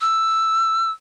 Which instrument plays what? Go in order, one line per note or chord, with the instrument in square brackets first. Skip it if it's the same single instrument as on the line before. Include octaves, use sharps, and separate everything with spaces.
[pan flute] E6